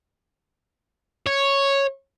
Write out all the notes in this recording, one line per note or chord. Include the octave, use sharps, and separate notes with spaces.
C#5